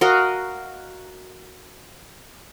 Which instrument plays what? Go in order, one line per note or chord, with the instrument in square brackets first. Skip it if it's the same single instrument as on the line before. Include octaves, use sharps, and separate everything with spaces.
[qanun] F#4 A#4 D#5 F5